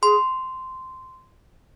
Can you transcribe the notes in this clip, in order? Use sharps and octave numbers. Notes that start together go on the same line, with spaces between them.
G#4 C6